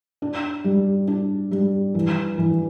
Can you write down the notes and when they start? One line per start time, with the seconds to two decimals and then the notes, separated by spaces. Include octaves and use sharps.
0.22 D4
0.65 G3
1.08 D4
1.51 G3
1.94 E3
2.38 E3